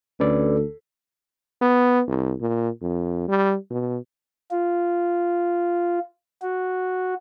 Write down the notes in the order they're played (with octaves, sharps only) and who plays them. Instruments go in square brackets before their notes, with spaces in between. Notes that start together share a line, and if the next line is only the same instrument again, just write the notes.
[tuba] D2 [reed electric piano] C#4 B4 D5 [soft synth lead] A4
[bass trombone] B3
C2
A#2
F2
G3
B2
[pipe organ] F4
F#4